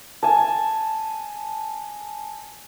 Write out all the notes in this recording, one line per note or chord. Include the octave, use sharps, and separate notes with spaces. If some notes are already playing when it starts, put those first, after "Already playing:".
G#5 A5